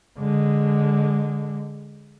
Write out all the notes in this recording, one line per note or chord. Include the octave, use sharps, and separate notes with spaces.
D3 G#3